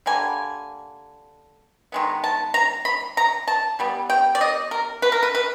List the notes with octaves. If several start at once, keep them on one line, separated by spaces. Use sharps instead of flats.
D3 G3 A#3 G#5
D#3 G#3 B3
A5
A#5
B5
A#5
A5
E3 G3 B3
G5
D5
D#5
A#4
B4
A#4
B4
B4